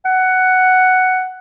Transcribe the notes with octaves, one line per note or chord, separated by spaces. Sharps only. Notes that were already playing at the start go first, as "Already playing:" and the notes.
F#5